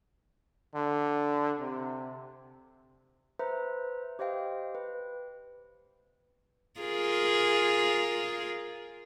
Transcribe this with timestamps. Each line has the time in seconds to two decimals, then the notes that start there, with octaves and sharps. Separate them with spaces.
0.74 D3
1.60 C3
3.39 B4 C5 E5 A#5
4.19 G4 C5 D#5 F5 G5
4.75 B4
6.80 F4 G#4 A#4